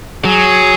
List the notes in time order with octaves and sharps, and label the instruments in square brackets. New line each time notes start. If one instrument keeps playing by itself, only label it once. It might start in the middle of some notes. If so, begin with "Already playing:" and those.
[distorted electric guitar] F#3 [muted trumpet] G#4